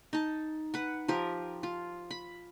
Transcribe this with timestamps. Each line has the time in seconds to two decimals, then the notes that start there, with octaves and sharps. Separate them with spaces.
0.13 D#4 A5
0.74 B4 F#5
1.08 F3 G4 A#4
1.63 F4
2.11 B5